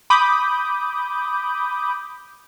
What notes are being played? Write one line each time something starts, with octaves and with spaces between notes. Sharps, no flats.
B5 D6 D#6 G6